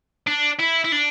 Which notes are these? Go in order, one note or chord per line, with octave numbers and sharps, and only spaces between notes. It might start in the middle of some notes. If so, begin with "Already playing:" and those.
D4
E4
E4
D4